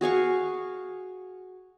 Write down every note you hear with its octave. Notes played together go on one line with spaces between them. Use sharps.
F#4 G#4 F5 C#6